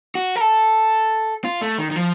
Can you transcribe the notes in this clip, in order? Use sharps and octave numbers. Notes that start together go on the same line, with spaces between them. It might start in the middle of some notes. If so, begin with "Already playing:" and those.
F#4
A#4
A4
F4
A3
D#3
D#3
F3